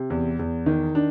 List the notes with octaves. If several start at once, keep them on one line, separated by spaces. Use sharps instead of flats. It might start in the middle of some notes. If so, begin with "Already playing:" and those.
Already playing: C3
E2
E2
D#3
D4